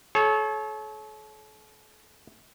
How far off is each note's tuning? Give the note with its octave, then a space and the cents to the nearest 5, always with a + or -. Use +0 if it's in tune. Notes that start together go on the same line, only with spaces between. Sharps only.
A4 -40 C#5 -10